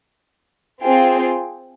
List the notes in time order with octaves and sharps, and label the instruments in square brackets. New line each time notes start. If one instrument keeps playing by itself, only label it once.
[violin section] C4 F4 G#4 C5 G5